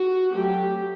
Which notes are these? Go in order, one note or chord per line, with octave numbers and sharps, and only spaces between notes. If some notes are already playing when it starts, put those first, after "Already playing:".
Already playing: F#4
F#3 A3 C4 G4